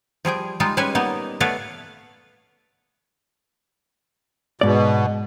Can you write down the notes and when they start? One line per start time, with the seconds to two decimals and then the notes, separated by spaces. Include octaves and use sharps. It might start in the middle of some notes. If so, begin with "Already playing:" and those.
0.25 F3 G3 G#4 G5
0.60 G3 G#3 D#4 F4
0.77 G3 G#3 C#4 B4 C#5 G#5
0.95 A#3 B3 D#4 D#5
1.40 A3 B3 B4 C#5 D5 F5
4.61 G#2 B2 D5